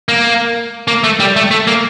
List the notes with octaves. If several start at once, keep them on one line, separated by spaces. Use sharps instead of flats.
A#3
A#3
A3
G3
A3
A3
A#3